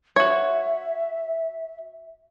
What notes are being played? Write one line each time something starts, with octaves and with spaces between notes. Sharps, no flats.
F#4 C#5 E5